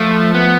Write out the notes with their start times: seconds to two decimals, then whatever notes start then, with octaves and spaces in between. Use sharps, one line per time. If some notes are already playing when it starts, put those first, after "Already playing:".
Already playing: F3 A3
0.34 B3